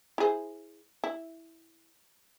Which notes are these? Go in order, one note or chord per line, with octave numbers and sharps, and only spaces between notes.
E4 G#4 C5
E4